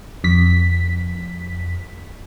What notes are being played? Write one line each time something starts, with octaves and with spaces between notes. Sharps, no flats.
F2 B6